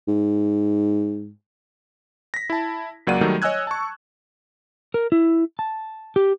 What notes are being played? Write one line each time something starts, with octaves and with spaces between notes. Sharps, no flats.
G#2
A#6 B6
E4 A5
C#2 F#3 A#3 D5 F#5 D#7
D#3 F#3 G3 A3 D#4
C#5 D#5 G#5 E6 F#6 G#6
A5 C#6
A#4
E4
A5
G4